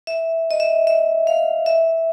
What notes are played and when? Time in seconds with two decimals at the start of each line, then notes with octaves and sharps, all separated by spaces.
0.07 E5
0.51 D#5
0.60 E5
0.87 E5
1.27 F5
1.66 E5